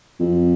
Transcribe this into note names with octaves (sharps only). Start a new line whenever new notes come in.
F2